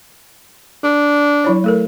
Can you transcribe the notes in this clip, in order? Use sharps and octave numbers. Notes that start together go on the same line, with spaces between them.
D4
F#3 E4 C#5
A3 A4 A#4